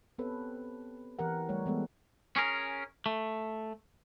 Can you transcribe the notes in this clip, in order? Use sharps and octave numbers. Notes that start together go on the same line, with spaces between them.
B3 C4 G4 A4 B4 C#5
E3 G4 A#4 F#5
G3 A3 C#5
E3 G#3 B3 A4
C#4 G#4 A#4
A3